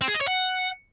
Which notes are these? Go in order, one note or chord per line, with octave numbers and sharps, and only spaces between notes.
C4
G#4
D#5
C#5
F#5